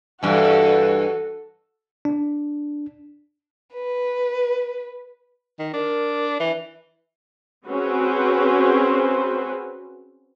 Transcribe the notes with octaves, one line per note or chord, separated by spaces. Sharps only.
G2 E3 F#4 A4
D4
B4
D#3
D4 A#4
E3
C4 C#4 F#4 G#4 B4 C5